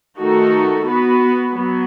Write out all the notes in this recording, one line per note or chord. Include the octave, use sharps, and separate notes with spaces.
D#3 A3 D#4 F#4 A4
B3 F#4 B4
F#3 B3